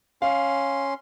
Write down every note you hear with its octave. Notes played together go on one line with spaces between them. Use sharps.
C#4 F5 C6